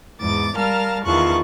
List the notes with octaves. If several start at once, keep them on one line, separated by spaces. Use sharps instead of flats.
E2 G#2 D6 A6
G3 A#4 F5 A5 F6
E2 D#3 F4 A5 C#6 F#6